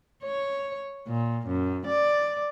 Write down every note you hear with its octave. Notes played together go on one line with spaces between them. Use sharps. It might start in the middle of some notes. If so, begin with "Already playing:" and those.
C#5
A#2
F#2
D5